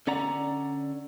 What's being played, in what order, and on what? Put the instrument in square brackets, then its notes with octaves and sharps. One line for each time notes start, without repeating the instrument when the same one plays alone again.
[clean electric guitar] D3 C#4 D5 F#5 A#5